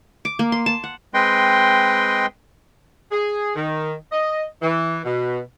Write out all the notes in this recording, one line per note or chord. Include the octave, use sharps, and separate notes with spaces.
D6
A#3
C6
A5
F#5
G#3 C4 B4 D#5 G5 C6
G#4
D#3
D#5
E3
B2